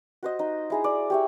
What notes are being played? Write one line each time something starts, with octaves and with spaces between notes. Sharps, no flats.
F#4 C5 D#5
D#4
E4 G#4 A#5
D5
G4 C#5 E5